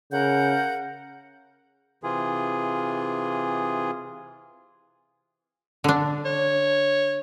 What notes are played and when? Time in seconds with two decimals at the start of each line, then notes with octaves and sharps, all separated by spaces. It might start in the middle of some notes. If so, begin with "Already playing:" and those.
0.12 C#3 A#4 F#5 G6
2.04 C3 E3 F4 G#4
5.84 D3 D4
6.25 C#5